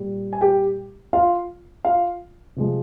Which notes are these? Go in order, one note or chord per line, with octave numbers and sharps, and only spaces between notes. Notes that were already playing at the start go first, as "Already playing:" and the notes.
Already playing: A#2 G3
G#5
G4 G5
F4 F5
F4 F5
C3 F3 G#3